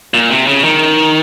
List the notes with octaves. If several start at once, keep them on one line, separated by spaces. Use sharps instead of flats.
A#2
C3
C#3
D#3